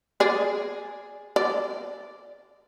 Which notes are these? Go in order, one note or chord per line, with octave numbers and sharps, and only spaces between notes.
G#4 D5
D5